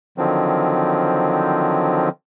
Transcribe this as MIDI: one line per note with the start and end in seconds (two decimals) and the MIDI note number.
0.18 2.09 50
0.18 2.09 51
0.18 2.09 53
0.18 2.09 54
0.18 2.09 60